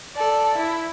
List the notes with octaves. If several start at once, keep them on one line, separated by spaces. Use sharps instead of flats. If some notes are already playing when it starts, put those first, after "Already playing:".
A4 D5
E4